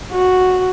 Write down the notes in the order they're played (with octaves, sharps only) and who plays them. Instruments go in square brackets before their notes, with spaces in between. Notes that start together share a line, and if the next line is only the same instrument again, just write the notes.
[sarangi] F#4